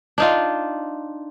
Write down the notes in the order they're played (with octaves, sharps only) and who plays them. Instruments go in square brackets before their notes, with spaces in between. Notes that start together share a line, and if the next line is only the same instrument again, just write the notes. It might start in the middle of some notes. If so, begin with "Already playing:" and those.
[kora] D4 D#4 F4